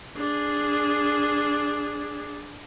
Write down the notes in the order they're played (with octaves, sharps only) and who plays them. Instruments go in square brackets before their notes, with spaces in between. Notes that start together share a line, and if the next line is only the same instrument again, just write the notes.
[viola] D4 G#4